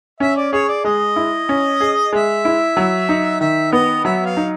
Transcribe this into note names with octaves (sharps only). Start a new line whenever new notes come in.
C#4 E5
D5
G#4 C#5
D5
G#3 D#5
E4
C#4
G#4
G#3 E5
E4
F#3
D#4
D#3 E5
B3 D#5
F#3 E5
F5
D#4